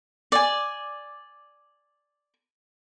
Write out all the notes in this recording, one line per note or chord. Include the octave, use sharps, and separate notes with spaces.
D5 G#5